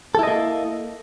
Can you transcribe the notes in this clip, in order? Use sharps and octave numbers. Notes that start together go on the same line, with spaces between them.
A#3 E4 A4 D#5